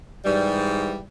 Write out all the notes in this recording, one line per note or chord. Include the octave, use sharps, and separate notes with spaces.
G#2 E3 G3